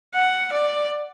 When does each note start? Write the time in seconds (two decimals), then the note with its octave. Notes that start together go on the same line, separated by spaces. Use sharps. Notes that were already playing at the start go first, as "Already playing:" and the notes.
0.15 F#5
0.53 D5